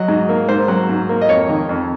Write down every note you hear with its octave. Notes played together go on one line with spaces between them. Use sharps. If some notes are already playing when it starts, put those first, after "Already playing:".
Already playing: F#3 D#5
G#2
A#3
G#2 C5
F#3
G#2
A#3
D#5
F2 C#5
D#3
F2